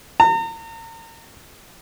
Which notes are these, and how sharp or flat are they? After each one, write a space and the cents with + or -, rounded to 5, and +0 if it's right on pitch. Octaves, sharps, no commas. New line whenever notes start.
A#5 -40